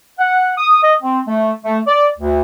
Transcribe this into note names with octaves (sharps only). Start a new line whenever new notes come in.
F#5
D#6
D#5
C4
A3
A3
D5
D2